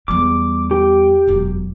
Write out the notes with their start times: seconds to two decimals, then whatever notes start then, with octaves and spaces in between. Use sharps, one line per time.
0.08 E2 G3 D6
0.71 G4
1.27 E1 F#2